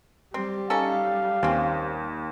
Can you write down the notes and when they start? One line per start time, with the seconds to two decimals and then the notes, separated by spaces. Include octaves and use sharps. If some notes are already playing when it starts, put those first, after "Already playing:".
0.34 G3 C4
0.70 C#4 D#4 A4 F5
1.43 D#2 C4 C#4